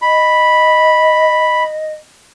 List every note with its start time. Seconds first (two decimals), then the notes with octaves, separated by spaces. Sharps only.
0.02 D#5 B5